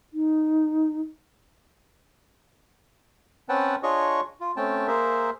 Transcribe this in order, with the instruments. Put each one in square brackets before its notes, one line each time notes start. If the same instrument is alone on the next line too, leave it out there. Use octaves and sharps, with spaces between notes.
[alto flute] D#4
[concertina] C4 C#4 B4 F#5 G5 A5
D4 F4 G#4 C#5 D#5 C#6
F4
A3 C4 C#4 G5 A5
A#3 G#4 A#4 C5 E5